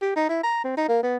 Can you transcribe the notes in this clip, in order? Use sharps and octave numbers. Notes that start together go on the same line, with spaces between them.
G4
D#4
E4
A#5
C4
D#4
A#3
B3